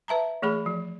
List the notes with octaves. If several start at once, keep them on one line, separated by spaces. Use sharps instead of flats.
B4 E5 A5 A#5
E3 A3 G#4 B5
F3